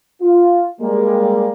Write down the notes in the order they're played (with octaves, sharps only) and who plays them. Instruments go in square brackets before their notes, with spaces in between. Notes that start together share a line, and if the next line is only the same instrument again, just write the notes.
[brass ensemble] F4
G3 G#3 A#3